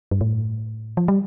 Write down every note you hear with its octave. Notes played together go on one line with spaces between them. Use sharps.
G2
A2
F3
G3